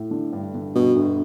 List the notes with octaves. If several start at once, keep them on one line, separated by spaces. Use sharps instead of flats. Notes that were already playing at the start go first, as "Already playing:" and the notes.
Already playing: A2
D3
G2
D3
G2 B2
G1